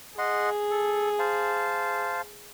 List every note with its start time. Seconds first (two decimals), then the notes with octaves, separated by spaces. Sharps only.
0.18 G#4 D#5 F#5 C6
0.71 A4
1.19 C5 F5 A5